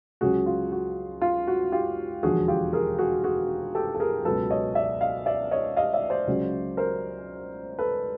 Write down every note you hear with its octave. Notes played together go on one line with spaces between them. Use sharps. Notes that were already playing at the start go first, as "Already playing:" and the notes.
C#2 C#3 F#3 F#4 G#4
F4
F#4
F4
F#4
F4 G4
E1 D#2 D3 F3 F#4 G#4
F4 G4
G#4 A#4
F#4 G#4
F#4 G#4
G4 A4
A4
G#4 A#4
C#2 B2 F#3 A4 B4
C#5 D#5
D5 E5
D#5 F5
D5 E5
C#5 D#5
D#5 F5
D5 E5
C5 D5
C#2 C#3 F#3
A#4 C5
A4 B4